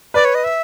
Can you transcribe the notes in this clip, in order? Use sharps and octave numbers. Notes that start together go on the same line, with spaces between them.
B4 D5
C#5
D#5
E5